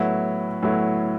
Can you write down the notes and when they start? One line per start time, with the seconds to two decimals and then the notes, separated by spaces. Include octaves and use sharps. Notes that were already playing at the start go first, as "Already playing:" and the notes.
Already playing: A2 F#3 B3 E4
0.63 A2 F#3 B3 E4